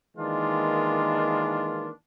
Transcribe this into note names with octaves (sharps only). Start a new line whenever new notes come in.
D#3 E3 G#3 A#3 D4 F4